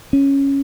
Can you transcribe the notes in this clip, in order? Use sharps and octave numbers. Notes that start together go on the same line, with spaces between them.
C#4